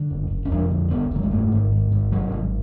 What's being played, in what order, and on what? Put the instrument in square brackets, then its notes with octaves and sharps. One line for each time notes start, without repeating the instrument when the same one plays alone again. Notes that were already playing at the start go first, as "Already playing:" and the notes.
Already playing: [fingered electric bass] D3
F#1
F#1
C#4
F2 D4
D3
F#1 B3
F#1 F#3
G#3
G#2 A3
G#1
G#2
G#1
G#2 F#3
G#1